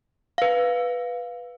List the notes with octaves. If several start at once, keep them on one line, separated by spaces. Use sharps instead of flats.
B4 F5